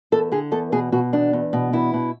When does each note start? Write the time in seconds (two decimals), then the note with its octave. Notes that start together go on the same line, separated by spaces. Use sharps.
0.12 E2 A4
0.32 D3 G#4
0.52 E2 A4
0.72 B2 G#4
0.92 B2 F#4
1.13 E2 D4
1.33 E2
1.53 B2
1.73 E2 E4
1.94 B2